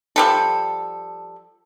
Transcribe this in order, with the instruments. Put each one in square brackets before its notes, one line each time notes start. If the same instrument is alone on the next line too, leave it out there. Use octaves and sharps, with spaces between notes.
[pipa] F3 G3 A4